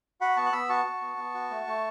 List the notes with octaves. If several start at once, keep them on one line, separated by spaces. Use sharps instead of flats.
F#4 F#5 B5
B3 A5 C#6
F#6
B3 B5 E6
F#4 A5 C#6
F#4
B3
B3
F#4
A3
A3